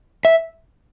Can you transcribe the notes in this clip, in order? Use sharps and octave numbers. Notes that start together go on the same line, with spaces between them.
E5